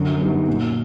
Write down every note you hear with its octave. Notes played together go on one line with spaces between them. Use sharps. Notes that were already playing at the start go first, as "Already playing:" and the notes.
Already playing: F#2 D3
G3 B3 D#4
A#2